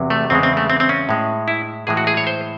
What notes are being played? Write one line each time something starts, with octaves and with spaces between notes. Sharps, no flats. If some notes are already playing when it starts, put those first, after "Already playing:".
Already playing: E2 C3 F#3
A3
E2 C#3 G#3 C4
C4
A3
C4
C4
C#4
A2 G#3
E4
A2 E3 G#3 G#4
F#4
G#4
C#5
C5